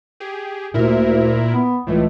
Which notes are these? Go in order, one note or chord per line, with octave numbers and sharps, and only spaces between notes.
G4 G#4
D2 A#2 E4 A#4
B3
C#2 A2 E3 A3